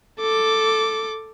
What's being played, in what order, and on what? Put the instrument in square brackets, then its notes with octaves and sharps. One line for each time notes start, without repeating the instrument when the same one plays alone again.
[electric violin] A4 D6